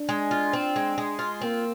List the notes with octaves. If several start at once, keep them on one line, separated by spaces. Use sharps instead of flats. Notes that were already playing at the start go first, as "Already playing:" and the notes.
Already playing: D4
G#3
F4
C4
G#3
G#3
F4
A#3 C4